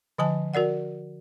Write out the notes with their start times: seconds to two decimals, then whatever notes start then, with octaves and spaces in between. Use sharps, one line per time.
0.18 D3 F3 G#5 A5
0.54 F#4 A#4 D5 F#5